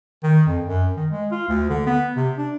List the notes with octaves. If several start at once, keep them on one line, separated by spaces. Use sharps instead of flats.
D#3
F2
F#2
D#3
G#3
F4
D2
D3
B3
C3
D4